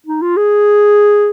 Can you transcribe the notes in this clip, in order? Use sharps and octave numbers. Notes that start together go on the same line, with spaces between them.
D#4
F4
G#4